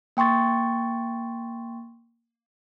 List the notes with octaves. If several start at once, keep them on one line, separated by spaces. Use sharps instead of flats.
A#3 G5 C6 C#6 A6